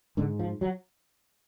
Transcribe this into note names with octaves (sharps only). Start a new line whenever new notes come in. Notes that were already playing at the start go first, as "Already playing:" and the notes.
G#2 D3
F3
F#3